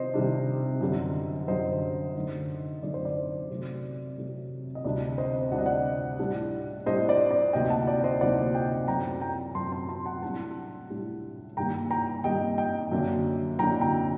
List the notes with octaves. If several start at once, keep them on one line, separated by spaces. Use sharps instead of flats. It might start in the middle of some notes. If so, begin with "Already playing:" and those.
Already playing: C3 D#3 C5 D#5
C3 D#3 G3 D4
F#2 D3 G3
F#2 D3 G3 C5 D#5
F#2 D3 A3 D#4
F#2 D3 A3 D#4 D5
C5
D5
C3 F#3 A3
C3 F#3 A3
D#5
D2 C3 G3 D4 D5
C5 D#5
D2 C3 G3 D4 F#5
D#5
D5 F#5
A2 G3 D4
A2 G3 D4 C5 D#5
D5
D5
D2 C3 F#3 A#3 D#4 D#5 G5
F#5 A5
D5
C5 D#5
D2 C3 F#3 A#3 D#4 D5 F#5
D#5 G5
F#2 F#3 A3 C4 G5 A#5
G5 A#5
F#2 F#3 A3 C4 A5 C6
A5 C6
A5 C6
F#5 A5
A2 G3 D4 F#5 A5
A2 G3 D4
G2 D#3 G3 A#3 G5 A#5
G5 A#5
G2 D#3 G3 A#3 D#5 G5
D#5 G5
F#2 D3 F#3 A#3 D4
F#2 D3 F#3 A#3 D4 G5 A#5
G5 A#5